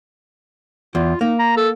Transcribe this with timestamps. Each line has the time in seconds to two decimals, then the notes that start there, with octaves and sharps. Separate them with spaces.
0.95 E2 F4
1.21 A#3 D#4
1.39 A#5
1.57 A4